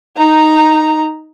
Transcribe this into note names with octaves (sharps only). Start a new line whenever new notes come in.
D#4 A#5